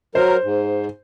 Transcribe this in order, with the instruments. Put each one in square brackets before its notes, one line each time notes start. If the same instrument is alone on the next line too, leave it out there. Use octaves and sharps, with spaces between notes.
[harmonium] F#3 A#4 [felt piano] C5
[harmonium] G#2